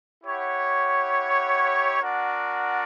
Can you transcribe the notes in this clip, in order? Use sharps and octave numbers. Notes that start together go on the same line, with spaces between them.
E4 G4 C#5 F#5
D4 F#4 A#4 D5 F#5